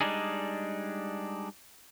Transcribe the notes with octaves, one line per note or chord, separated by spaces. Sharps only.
G3 G#3 D4 D#4 G#4